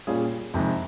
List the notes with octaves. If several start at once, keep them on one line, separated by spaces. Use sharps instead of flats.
A#2 G3 C#4 F4 G#4
F2 C3 D#3 G#3